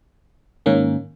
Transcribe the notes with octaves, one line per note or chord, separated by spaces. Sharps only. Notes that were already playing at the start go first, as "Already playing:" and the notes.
G#2 D#3 A#3 C#4